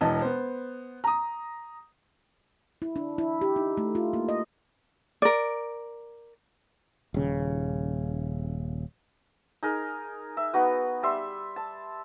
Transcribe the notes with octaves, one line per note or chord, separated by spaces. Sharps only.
E1 E3 D#5 A5
B3 C5
A#5 D#6
E4
D4
E4
G4
D#4
A3
F4
A#3
D#5
A#4 D5
D#1 C#3
D#4 G#4 A#4
E5
B3 D#4 F#4 B4
G3 E5 C6
A5